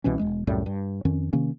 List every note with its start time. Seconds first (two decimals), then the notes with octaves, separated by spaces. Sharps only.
0.04 C2 B2 E3 C#4
0.19 E1 G#3
0.47 C2 F#2 A2 G3
0.66 G2
1.05 F2 D#3 C#4
1.33 C3 D#3 A#3 C#4